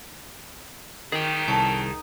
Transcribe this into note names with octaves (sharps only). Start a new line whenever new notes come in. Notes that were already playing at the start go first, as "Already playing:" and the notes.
D#3 G#4 G5
C2 C#4 A4 A5